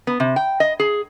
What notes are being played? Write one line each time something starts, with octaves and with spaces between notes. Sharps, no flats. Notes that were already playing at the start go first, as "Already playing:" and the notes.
B3
C3
G5
D#5
G#4